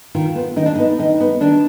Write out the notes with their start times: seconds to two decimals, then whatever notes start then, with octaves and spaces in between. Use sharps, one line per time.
0.15 D#3 F4
0.35 B3
0.56 D#3 D#4
0.66 D4
0.75 B3 D#4
0.99 D#3 D#4
1.20 B3
1.41 D#3 D4